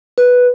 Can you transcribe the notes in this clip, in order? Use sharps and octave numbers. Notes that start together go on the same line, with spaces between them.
B4